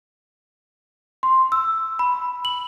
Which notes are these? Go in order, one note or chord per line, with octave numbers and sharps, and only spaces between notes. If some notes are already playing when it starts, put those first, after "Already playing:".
C6
E6
B5
F#7